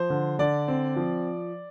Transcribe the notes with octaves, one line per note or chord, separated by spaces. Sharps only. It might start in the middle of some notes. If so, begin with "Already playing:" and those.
Already playing: F3 C5
D3
D3 D5
C4
F3